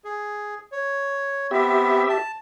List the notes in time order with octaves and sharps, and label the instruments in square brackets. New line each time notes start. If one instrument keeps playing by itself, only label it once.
[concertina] G#4
C#5
[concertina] B3 C4 [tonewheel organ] G4 E5
[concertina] A5